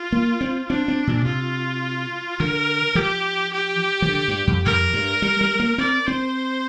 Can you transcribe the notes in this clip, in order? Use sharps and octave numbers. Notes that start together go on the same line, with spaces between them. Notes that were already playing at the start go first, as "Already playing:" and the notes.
Already playing: F4
A#3
C4
C4 D4
C4
A#2
C3 F4
D3 A#4
F3 G4
G4
F3
D3
G2
F2
F2 A#4
G2
G3
G3
A#3
C4 D5
C4 C5